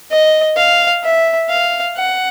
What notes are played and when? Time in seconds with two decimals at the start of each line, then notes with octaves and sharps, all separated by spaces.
0.11 D#5
0.57 F5
1.03 E5
1.50 F5
1.97 F#5